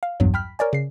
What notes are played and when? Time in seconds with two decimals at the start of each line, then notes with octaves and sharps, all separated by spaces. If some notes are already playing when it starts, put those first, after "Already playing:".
0.03 F5
0.20 B1 E2 G2 F#3
0.34 G5 B5 F6 B6
0.59 A#4 C#5 D5 G#5
0.73 C#3 C7